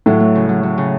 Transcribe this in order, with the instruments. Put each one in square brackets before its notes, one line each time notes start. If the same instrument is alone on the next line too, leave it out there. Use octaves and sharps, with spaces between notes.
[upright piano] A2 [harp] F#3
[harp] A3
C#3
F#3
F#3
C#3